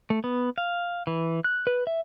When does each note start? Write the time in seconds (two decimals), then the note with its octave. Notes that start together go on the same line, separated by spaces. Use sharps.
0.10 A3
0.24 B3
0.58 F5
1.07 E3
1.44 F#6
1.67 B4
1.87 E5